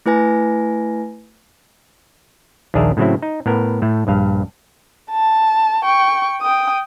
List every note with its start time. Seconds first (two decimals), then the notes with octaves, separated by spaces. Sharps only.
0.06 A3 E4 B4 G#5 A#6
2.74 A#1 D#2 D4 G#4 A#4 E5
2.97 A2 C#3 F#3 C4 E4
3.22 D#4
3.46 A2 B3 A#4
3.82 A2 A3
4.07 A#1 G2 F5
5.11 A5
5.85 G5 C#6
6.41 G5 D#6